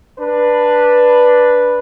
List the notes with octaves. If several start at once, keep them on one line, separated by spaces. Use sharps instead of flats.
D4 B4